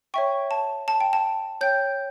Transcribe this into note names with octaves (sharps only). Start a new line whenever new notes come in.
C#5 E5 G5 C#6
A5
A5
G5
A5
C#5 G5 G6